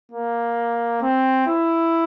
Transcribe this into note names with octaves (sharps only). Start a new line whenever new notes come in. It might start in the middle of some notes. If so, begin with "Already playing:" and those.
A#3
C4
E4